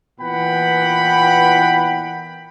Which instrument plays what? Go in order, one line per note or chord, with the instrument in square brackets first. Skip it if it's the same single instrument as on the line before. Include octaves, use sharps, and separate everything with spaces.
[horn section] A#2 E3 B3 F#5 G5 B5